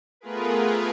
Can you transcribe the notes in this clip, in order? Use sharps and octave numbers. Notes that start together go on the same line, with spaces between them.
A3 B3 F4 G#4 A#4 B4